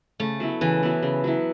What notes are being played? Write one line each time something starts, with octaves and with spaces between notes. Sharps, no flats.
C#3 A3
F#3 B3 E4
C#3 E3
F#3 B3 E4
C#3
F#3 B3 E4